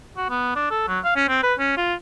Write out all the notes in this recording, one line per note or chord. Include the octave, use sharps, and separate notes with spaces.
F#4
B3
D4
A4
F#3
F5
C#4
C4
B4
C#4
F4